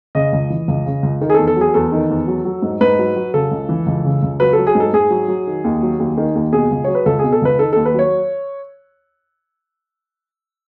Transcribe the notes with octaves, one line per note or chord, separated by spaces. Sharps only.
C#3 D#5
C#2
E3
C#2
C#3
C#2
D#3
G#4
A4
E2
A4
F#3 G#4
E2 A4
D#3
E2
F#3
F#3
G#2
G#2 B4
F#3
F#3
C#3 A4
C#2
E3
C#2
C#3
C#2
F#3 B4
F#3 A4
G#4
G#2
A4
G#2 G#4
F#3
F#3
D#3
D#2
F#3
D#2
D#3
D#2
B2 G#4
C#2
F#3 C#5
B4
C#2 A4
B2 G#4
A4
C#2 B4
D#3 A4
D#2 A4
B4
F#3 C#5